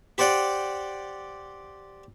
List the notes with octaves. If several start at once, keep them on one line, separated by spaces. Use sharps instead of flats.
G4 C5 D5 F#5 G5